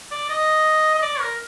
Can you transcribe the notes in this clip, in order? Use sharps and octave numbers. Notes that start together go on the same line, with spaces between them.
D5
D#5
D#5
D5
A#4